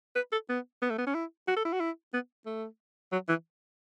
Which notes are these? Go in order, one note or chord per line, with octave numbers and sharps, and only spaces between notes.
B4
A4
B3
B3
A3
B3
C#4
E4
F#4
A4
E4
F#4
E4
B3
A3
F#3
E3